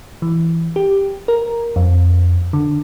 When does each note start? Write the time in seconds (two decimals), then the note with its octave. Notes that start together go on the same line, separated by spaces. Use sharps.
0.22 E3
0.76 G4
1.28 A#4
1.76 F2
2.53 D3